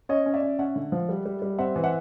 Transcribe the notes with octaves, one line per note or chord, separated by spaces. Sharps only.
C#4 C#5 D#5
C#4
D5 E5
C#4
C#4 E5 F#5
D3
F3
G3
G3
G3
C4 E5 F#5
E3
E5 F#5